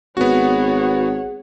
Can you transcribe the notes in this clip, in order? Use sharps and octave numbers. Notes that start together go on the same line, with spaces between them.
G#1 B3 F#4 G#4 C#5 F#5